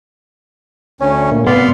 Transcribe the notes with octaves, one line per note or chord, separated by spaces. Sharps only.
D2 C#4 C#5
A#2 A3 A#3
G#2 C3 B3 D5 F5 C6